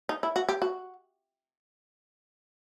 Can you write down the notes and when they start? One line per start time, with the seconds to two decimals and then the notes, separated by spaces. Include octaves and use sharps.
0.09 D#4
0.23 E4
0.36 F#4
0.49 G4
0.62 F#4